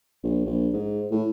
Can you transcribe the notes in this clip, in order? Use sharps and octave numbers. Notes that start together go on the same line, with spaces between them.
A#1
A#1
G#2
A2